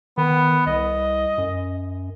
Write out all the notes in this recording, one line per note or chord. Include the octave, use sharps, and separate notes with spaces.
D#3 B3
C2 D#5
F#2